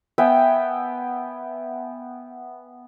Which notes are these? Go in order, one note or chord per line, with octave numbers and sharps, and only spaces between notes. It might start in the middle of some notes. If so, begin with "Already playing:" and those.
B3 E5 G5 G#5